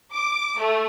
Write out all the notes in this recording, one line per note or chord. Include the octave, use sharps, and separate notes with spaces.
D6
A3